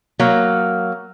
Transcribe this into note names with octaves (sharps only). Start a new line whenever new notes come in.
F#3 A#3